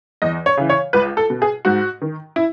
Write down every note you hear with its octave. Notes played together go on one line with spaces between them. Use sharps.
E2 D#5
C#5
C#3 E3
C#5
C#2 B4
A4
B2
G#4
G#2 F#4
D#3
E4